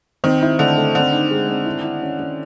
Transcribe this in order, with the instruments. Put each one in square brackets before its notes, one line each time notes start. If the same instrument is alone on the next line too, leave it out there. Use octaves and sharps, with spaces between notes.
[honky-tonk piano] D#3 [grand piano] C4
[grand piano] E4
[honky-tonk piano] D3 [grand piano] A3
[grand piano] A3
[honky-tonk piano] D3 [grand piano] C4
[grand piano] D#4
G#3
C4
E4
E4
C#4
C#4